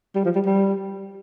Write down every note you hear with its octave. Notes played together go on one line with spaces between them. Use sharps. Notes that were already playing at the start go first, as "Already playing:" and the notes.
G3
F3
G3
G3